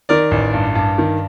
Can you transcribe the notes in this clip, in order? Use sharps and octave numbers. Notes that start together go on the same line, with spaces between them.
D#3 A#4 D5
A1
G2
G2
D#3